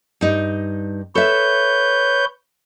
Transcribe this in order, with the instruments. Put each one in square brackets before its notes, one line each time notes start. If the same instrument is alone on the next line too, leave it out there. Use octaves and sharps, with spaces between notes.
[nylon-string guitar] G2 D#4
[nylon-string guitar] A4 E5 [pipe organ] B4 C#5 G6